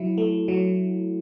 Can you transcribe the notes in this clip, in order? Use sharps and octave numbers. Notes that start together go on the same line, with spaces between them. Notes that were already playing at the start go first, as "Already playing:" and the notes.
Already playing: F#3 E4
A3
F#3